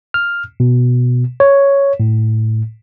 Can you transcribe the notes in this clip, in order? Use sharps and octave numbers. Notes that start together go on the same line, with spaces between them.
F6
B2
C#5
A2